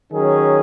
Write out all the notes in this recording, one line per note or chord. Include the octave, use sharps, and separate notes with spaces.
D#3 F#3 C#4 G#4